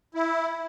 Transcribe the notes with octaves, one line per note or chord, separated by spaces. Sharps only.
E4